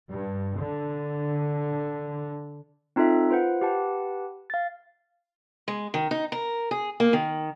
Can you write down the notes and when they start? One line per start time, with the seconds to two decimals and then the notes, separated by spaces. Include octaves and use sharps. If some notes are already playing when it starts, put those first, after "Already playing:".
0.11 G2
0.58 D3
2.96 C4 D#4 F4 A4 E5
3.30 F4 B4 C5 F#5
3.61 G4 B4 F#5 A5
4.50 F5 A6
5.68 G#3
5.94 D#3
6.11 D#4
6.32 A#4
6.71 G#4
7.00 A#3
7.13 D#3